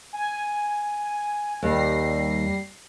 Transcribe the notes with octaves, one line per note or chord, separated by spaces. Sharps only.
G#5
D#2 G3 A#6 C7